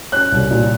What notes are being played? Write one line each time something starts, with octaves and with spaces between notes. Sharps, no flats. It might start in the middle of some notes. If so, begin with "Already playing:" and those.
C#4 F#6
C2
A#2